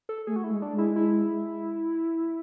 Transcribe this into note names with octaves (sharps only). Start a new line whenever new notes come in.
A4
A3 G#4
F#4
E4
G#3
D4
G#3
E4
E4